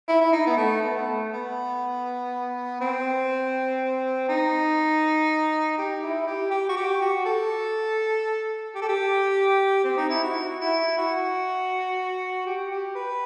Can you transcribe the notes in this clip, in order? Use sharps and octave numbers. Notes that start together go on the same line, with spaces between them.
E4
E4
D#4
B3
A3
B3
A3
B3
C4
D#4
G4
E4
G4
G4
F#4
G4
F#4
A4
G4
A4
G4
C4
D#4
E4
F#4
E4
F#4
G4
G4
B4